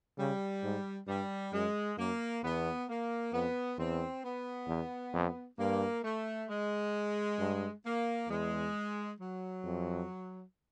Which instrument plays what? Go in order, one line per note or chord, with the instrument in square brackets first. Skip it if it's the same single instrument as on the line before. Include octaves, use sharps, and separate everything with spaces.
[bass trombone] C#3 [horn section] G3
[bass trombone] G#2
[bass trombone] G2 [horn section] G3
[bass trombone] F#2 [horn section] G#3
[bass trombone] F#2 [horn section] A#3
[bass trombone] E2 [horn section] B3
[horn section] A#3
[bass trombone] F2 [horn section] B3
[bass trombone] E2 [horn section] C4
[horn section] B3
[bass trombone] E2
F2
[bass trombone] G2 [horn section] A#3
[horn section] A3
G#3
[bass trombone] G2
[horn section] A#3
[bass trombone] E2 [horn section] G#3
[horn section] F#3
[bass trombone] F2